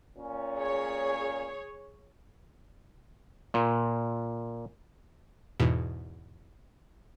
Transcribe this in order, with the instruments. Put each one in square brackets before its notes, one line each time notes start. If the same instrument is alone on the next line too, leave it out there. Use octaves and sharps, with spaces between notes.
[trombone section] A#2 C#4
[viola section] G#4 C#5
[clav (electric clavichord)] A#2
[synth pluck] E2 G#2 B2